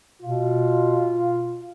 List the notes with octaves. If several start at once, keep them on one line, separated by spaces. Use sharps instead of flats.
B2 F4